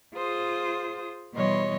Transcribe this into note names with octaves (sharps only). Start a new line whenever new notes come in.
F4 G#4 C5 D#6
B2 E3 G3 C#5 D#5 C6